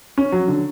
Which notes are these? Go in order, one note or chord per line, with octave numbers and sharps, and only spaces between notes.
C#4
F#3
D3